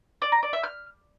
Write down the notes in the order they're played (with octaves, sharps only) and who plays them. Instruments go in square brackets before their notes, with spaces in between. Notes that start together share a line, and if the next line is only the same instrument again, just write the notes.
[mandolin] D5
A#5
D5
E5
F6